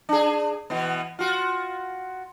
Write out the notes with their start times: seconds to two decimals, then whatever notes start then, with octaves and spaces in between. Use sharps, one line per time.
0.09 D4 G#4
0.70 B2 E3 B3
1.19 F4 F#4